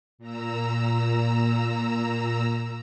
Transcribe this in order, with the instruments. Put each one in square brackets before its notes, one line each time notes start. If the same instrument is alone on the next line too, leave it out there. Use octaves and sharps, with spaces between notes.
[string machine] A#2 A#5 E6